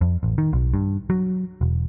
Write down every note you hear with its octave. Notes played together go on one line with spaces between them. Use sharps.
F2
A1
D#3
B1
G2
F#3
E1